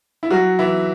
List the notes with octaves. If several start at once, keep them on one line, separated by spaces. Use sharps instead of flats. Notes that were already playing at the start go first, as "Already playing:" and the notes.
E4
F#3 F#4
E3 E4